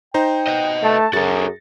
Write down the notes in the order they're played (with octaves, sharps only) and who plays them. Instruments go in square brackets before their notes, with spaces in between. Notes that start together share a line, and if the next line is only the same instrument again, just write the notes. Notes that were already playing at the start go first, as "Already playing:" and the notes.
[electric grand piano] D#4 C5 A#5 [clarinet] G5
[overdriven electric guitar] B4 D#5
[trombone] A3 [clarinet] A5
[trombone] F#2 [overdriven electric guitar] F#4 A4 [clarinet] G#4 [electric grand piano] A6